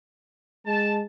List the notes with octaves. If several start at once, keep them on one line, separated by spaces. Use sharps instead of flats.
G#3 A5